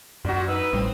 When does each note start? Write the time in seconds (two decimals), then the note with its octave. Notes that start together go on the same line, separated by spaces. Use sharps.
0.25 F#2 A#2 F#4
0.48 D#4 B4 E6
0.73 A1 A2 G3 C4